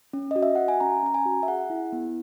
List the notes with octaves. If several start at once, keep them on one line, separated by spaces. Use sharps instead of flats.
C#4
F#4 D#5
E5
F#4 F#5
G#5
C#4 A#5
C#4 A#5
G#5
F#4
E5
G#4 F#5
E4
B3